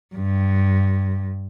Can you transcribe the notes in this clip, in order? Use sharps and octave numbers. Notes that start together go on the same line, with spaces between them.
G2